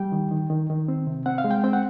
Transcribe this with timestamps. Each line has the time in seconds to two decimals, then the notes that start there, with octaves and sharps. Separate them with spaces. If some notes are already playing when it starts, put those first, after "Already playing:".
Already playing: G3 G5
0.12 D#3
0.31 D#3
0.50 D#3
0.70 D#3
0.88 C4
1.07 C3
1.26 C4 F#5
1.38 F5
1.44 G#3
1.51 G5
1.64 C4 G5
1.73 F#5